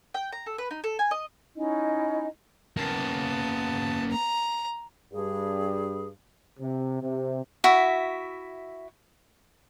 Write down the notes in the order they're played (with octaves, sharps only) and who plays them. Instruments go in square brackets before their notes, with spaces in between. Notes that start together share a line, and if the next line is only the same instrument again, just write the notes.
[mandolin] G5
A#5
A4
B4
D#4
A4
G#5
D#5
[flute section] C#4 D#4 E4 D#5
[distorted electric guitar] A#3 C#4 [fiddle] B3 A5
[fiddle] A#5
[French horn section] G2 [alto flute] G#4
[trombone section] C3
C3
[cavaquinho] E4 F#4 E5